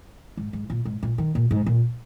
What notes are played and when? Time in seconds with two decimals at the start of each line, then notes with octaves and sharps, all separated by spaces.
0.37 G#2
0.53 G#2
0.70 A#2
0.85 G#2
1.03 A#2
1.18 D#3
1.35 A#2
1.51 G#2
1.66 A#2